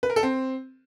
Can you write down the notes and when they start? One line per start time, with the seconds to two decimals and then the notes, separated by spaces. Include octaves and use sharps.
0.03 B4
0.10 A#4
0.16 A4
0.23 C4